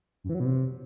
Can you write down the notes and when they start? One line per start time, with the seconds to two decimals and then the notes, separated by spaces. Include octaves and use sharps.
0.24 F#2
0.29 E3
0.35 F#3
0.40 B2
0.45 C3